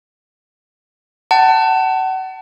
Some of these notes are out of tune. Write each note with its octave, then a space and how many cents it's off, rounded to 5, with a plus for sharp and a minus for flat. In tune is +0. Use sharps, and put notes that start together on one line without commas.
F#5 +35 A5 +15